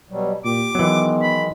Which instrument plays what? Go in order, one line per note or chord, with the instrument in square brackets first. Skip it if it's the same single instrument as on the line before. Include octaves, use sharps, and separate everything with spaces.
[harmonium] B2 F#3 G3
[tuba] A#2 [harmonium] G4 [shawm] D6
[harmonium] D#3 G#3 [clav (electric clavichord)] E3 F#3 [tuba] B3
[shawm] B5